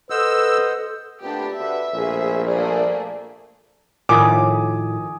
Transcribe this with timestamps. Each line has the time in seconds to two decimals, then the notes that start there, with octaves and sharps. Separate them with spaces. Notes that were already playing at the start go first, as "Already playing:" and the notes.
0.10 A4 B4 C5 D#5 F#5 E6
1.22 A#2 A3 B3 D4 G4
1.58 D3 F#4 B4 E5
1.94 A#1 B2 A3 G#4
2.46 G2 F3 A3 A#3 G#4 D5
4.09 A2 D#3 F3 G#5 D6 D#6